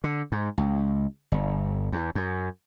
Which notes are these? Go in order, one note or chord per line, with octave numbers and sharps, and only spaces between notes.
D3
G#2
C#2
G1
E2
F#2